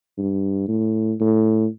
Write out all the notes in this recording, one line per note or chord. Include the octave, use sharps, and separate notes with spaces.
G2
A2
A2